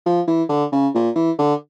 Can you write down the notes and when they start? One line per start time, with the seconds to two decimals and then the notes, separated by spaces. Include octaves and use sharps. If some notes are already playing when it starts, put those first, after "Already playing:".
0.06 F3
0.27 E3
0.49 D3
0.72 C#3
0.94 A#2
1.15 E3
1.38 D3